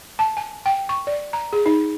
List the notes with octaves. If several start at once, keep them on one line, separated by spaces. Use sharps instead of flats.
A5
G#5
G5
C#6
D5
A#5
G#4
D#4